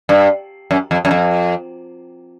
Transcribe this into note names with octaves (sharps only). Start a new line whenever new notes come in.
G2
F#2
F2
F#2
F2